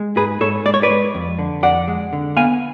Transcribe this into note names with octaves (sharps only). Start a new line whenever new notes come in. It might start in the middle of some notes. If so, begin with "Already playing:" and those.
Already playing: G#3
G#2 G#4 B4
G#2 A4 C#5
G#3 D5
C#5
B4 D5
G#3
F2
D3
F2 D5 F#5
G#3
D3
B3 F5 G#5